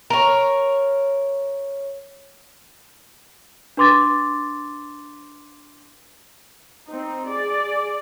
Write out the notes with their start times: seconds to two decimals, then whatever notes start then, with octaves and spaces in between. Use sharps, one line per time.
0.10 A#4 C#5
3.77 D4 B4 C6 D6 A6
6.87 C4 D#4
7.27 G#4 D5